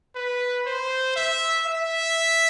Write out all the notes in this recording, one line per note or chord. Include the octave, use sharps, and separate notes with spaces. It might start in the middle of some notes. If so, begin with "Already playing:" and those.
B4
C5
E5
E5